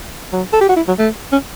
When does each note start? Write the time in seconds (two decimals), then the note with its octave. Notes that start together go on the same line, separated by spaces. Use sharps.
0.33 F#3
0.53 A4
0.61 G4
0.69 F#4
0.76 E4
0.88 F#3
0.99 A3
1.32 C#4